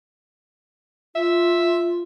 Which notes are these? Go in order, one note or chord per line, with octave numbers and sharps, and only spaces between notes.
F4 E5